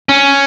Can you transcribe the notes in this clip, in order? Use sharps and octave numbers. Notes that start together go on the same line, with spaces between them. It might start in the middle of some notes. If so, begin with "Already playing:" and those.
C#4